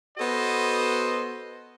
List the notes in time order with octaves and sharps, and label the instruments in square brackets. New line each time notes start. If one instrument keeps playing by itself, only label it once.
[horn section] B3 F#4 A4 C5 D#5